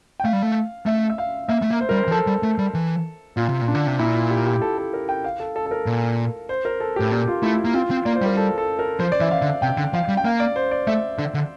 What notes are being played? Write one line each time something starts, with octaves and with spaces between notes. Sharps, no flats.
G5
A3 F5
G3
A3
A3 E5
E5
F5
A#3 E5
A3
A#3
C5
G3 A#4
C5
E3
F3 A4
G3
A3
G3
E3
A#2 F4
C3
A#2
D4
D3
C3
A#2 E4
F4
G4
G4
A4
A4
A#4
G5
F5
A4
A4
A4
A#4
A#2
C5
A#4
A4
A2 G4
A#2 G4
F4
A3 E4
E4
A#3
C4 F4
C4
A#3 D5
C5
G3 A#4
A4
A4
A#4
F3 C5
D5
E3 E5
F5
D3
C3 G5
D3
F3 F5
G3
G5
A#3 F5
D5
C5
D5
A3 E5
D3
D3